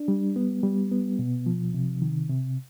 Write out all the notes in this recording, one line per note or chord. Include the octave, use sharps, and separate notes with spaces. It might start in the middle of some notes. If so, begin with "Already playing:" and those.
Already playing: D4
G3
B3
G3
B3
B2
F3
C3
D#3
C3